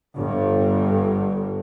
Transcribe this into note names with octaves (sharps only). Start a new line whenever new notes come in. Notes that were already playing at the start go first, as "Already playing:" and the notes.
G1 G2